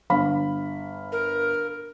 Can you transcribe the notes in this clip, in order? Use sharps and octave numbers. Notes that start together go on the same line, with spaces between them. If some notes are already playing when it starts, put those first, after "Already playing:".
G1 F5 B5
A#4